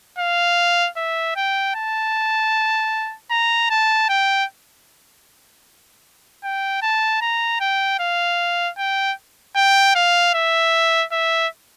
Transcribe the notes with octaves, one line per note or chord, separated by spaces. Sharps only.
F5
E5
G5
A5
A#5
A5
G5
G5
A5
A#5
G5
F5
G5
G5
F5
E5
E5